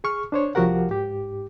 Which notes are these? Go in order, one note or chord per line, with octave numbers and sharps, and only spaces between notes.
G#4 C#6 F6
D4 C5 C#5
C2 F3 F#4 G4 A#4 F#5
G#2 G4